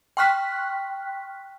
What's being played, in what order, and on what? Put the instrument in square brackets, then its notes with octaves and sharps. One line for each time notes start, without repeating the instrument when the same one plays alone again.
[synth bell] G5 C6 C#6 F6 F#6 B6